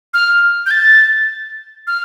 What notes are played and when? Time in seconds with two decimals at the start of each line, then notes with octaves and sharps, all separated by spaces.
0.14 F6
0.66 G6
0.71 A6
1.87 F6